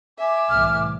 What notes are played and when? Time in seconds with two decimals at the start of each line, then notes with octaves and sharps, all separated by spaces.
0.18 E5 G#5 D6
0.49 C2 A2 E3 F6